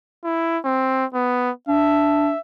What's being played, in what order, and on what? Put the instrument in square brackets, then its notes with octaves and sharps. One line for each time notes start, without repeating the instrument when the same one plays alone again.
[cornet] E4
C4
B3
[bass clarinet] D4 [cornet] E5